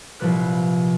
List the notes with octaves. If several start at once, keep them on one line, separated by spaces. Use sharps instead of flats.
C2 A#2 F3 G3 B4 F#6